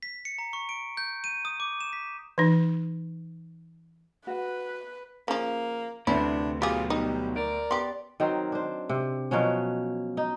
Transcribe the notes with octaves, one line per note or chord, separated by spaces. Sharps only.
B6
C#7
A#5
C#6
D7
G6
D#7
D#6
D6
E7
B6
E3 D#4
F#4 B4 F#5
C#3 F3 A#3
D2 C3 D4 E4 B4
B2 F#3 F4 G4 G#4
G3 D#4
A#4 D5
B3 G4 C6
D#3 F#3 C4
D4 C5
C3
B2 F3 F#3 C#4
D#4